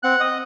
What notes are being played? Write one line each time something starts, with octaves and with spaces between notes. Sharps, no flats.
C4 F#5 F#6
D#5 D#6